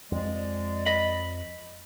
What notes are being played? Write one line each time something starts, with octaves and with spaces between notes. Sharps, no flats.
F2 F3 G#3 D5
D#5 B5